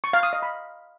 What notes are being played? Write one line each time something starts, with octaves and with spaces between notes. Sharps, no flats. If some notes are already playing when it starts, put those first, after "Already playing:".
C#6
F5
D#6
D#5
B5